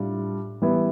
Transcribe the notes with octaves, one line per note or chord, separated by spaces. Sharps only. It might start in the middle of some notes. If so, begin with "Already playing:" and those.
Already playing: A2 G3 D4 F4
E3 G3 B3 E4 B4